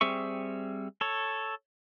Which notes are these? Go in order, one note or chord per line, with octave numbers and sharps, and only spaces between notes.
G3 C4 G#4 E5 C#6
A4 C#5